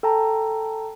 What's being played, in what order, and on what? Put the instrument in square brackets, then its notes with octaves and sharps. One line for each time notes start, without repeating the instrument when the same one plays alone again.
[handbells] A4 G5 A5 A#5